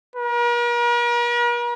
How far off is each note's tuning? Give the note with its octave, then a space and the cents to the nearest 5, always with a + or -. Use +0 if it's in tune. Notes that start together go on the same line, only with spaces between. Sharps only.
A#4 +45